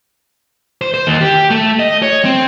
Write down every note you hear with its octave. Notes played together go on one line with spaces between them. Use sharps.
C5
C5
D#2
G4
A3
D#5
C#5
C4